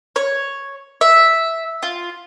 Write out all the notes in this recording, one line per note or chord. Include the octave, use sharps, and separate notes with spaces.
C#5
E5
F4